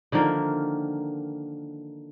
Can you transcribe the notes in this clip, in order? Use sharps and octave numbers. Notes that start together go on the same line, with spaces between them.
D3 D#3 F3 A#3